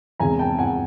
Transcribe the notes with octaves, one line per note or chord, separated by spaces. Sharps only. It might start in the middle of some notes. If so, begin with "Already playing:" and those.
E2 C3 D#3 G#3 G#5 A#5
G5 A5
F#5 G#5